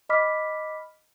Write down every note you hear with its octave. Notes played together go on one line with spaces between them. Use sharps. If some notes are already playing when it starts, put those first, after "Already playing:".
D#5 B5 D6 F6 B6